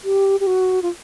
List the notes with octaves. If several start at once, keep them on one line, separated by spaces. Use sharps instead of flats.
G4
G4
F#4
F4